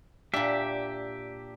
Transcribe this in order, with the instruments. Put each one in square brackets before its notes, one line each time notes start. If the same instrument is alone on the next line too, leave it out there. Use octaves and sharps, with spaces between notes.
[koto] A#2 D4 [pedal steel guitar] G4 E5